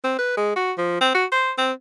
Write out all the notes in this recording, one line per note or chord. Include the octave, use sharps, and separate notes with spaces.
C4
B4
G#3
F#4
F3
C4
F#4
C5
C4